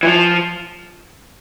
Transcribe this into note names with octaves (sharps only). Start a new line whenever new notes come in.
E3
F3